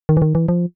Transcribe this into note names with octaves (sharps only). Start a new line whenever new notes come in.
D#3
E3
D#3
E3
F3